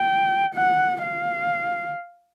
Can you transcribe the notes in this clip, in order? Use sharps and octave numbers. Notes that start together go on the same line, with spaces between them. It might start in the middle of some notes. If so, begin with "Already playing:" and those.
Already playing: G5
F#5
F5